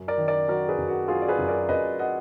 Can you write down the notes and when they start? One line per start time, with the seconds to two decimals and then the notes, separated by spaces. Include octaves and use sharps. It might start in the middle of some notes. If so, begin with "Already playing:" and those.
Already playing: F#2
0.08 A#4 D5
0.18 D#3
0.28 A#4 D5
0.48 F#3 F#4 A#4
0.68 G#4 B4
0.78 F#2
0.88 F#4 A#4
1.08 F#3 F4 G#4
1.22 D5
1.28 G#4 B4
1.38 F#2
1.48 A#4 D5
1.69 F#2 B4 D#5
1.99 D#5 F#5